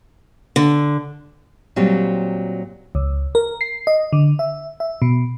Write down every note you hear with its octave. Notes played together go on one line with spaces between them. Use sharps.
D3
A#2 F#3 G3 C4
C#2
A#4
C7
D#5
D3
E5
E5
B2